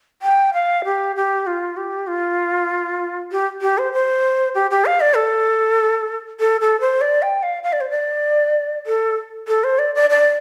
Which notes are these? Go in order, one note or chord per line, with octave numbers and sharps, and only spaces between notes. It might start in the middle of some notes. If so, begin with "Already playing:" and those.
G5
F5
G4
G4
F4
G4
F4
G4
G4
C5
C5
G4
G4
F5
D5
A4
A4
A4
C5
D5
G5
F5
F5
D5
C5
D5
A4
A4
C5
D5
D5
D5